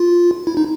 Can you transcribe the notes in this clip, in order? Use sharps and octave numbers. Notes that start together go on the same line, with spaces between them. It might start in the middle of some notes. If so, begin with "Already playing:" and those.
Already playing: F4
E4
D#4